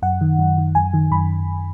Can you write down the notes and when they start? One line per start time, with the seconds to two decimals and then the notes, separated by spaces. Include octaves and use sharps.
0.02 F#2 F#5
0.21 D#3
0.39 F#2
0.58 D#3
0.75 F#2 G#5
0.94 D#3
1.11 F#2 B5